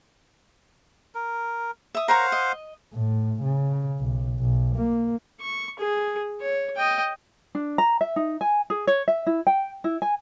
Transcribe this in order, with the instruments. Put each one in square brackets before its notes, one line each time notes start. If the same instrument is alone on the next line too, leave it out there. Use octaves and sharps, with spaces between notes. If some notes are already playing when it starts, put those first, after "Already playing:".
[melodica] A#4
[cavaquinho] E5 D#6
[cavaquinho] A#4 C#5 A#5 [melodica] C5 F5 F#5
[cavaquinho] D#5
[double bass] A2
C#3
B1
B1
A#3
[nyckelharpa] C#6
G#4
C#5
D#5 G5
[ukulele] D4
A#5
E5
D#4
G#5
G#4
C#5
E5
E4
G5
E4
G#5